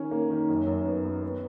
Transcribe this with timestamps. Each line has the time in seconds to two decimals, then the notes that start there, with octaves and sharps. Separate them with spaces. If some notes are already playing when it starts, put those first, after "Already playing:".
Already playing: D#3 C#4
0.11 A#3
0.30 D#3
0.49 F#2
0.67 F#2
0.86 B3
1.04 B3
1.23 B3